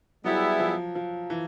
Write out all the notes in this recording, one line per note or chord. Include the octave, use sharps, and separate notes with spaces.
F#3 G3 B3 E4 G#4
F3
F3
E3